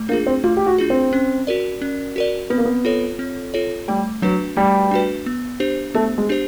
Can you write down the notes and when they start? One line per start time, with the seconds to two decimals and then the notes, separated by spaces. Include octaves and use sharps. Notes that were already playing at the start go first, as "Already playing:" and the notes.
Already playing: A3
0.09 A#3 D4 F4 G#4
0.27 C4
0.44 A3 F4
0.57 G4
0.66 F#4
0.78 D4 F4 G#4
0.90 C4
1.13 C#4
1.47 F#4 A#4 D5
1.81 C#4
2.16 F#4 A#4 D5
2.50 B3 C4
2.58 A#3
2.65 B3
2.85 F4 A4 C#5
3.19 C4
3.54 F4 A4 C#5
3.88 G3 A3
4.22 F#3 D4 F#4 B4
4.57 G3 A3
4.91 D4 F#4 B4
5.26 B3
5.60 D4 G4 C5
5.95 A3 B3
6.18 G#3
6.29 D4 G4 C5